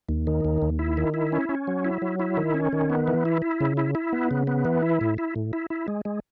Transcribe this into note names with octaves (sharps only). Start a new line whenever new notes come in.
D#2
D#3
D#2
D#2
E4
D#3
E4
C#4
C#4
F#3
E4
F#3
E4
D#3
C#4
D#3
B3
E3
E4
E4
C#3
E4
E4
B3
C#3
B3
E3
E4
A2
E4
A2
E4
E4
G#3
G#3